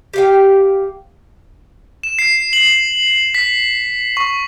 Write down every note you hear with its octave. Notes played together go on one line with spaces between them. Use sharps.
G4 F5 G5
E7
C7
F#7
B6
C#6